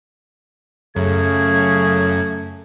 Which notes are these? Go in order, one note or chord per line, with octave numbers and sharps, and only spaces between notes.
F#2 C#3 A3 G#6